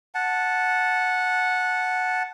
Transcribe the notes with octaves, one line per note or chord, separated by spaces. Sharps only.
F#5 A5